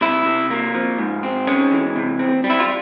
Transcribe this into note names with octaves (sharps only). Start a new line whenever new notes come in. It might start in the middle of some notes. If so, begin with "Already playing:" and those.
C3 E4
C3
A#3
F3
G#2
C4
G#3 C#4
E3
C3
C4
G3
E4
F4